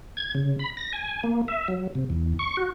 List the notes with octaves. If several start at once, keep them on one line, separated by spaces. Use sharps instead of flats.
G#6
C#3
B5
A#6
G#5
A#3
E5
F#3
C3
E2
C#6
F#4